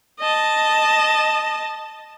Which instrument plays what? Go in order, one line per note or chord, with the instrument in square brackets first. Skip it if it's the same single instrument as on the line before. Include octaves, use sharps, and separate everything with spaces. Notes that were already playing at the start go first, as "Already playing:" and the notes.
[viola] D#5 A5